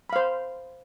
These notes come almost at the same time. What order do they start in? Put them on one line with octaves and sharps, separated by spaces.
B5 F5 C5